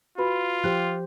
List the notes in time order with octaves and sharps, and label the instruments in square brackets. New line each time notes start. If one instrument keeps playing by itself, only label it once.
[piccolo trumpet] F4 [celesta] F#4 B4 B5
[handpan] F3 G4 C5 [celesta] F#6